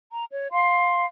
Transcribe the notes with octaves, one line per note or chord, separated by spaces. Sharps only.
A#5
C#5
F5 C6